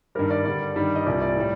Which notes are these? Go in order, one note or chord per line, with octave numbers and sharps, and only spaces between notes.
G2 D#3 G3 A#4
D5
G2 D3 G3 D5
G2 D#3 G3
D#5
C2 A#2 G3 D5
D5
A2 G3